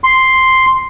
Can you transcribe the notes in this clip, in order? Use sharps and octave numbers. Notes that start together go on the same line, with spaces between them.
C6